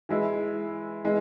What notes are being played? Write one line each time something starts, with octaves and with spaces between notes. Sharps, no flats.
E3 G#3 E4
E3 G#3